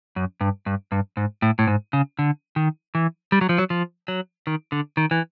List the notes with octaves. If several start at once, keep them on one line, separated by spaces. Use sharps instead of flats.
F#2
G2
G2
G2
G#2
A2
A2
G#2
C#3
D3
D#3
E3
G3
F#3
F3
F#3
F3
F#3
D#3
D3
D#3
E3